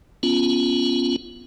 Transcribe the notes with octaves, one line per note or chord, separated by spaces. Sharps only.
B3 C#4 F4